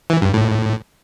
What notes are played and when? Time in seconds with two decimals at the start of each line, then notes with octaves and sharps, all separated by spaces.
0.10 E3
0.22 G2
0.34 A2